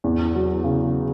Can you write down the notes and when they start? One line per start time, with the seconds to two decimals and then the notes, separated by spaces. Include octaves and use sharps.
0.04 E2
0.34 F#3
0.64 C#3